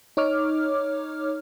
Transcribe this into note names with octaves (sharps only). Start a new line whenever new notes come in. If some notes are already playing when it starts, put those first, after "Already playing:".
D#4 C#5 D6 F6